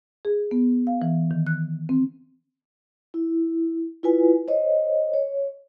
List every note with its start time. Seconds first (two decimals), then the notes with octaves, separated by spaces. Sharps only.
0.25 G#4
0.51 B3
0.87 F5
1.02 E3
1.31 D#3
1.47 F#6
1.89 C4
3.14 E4
4.03 E4 F4 B4 G#5
4.48 C5 C#5 D#5
5.14 C#5